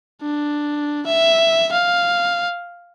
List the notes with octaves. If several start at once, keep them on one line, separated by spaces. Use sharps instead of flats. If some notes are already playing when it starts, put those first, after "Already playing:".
D4
E5
F5